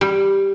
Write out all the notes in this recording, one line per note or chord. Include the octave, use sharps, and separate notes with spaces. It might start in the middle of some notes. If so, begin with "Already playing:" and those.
G3